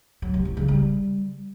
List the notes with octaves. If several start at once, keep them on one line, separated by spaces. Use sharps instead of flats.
F#3
C3
E3
C#3
G3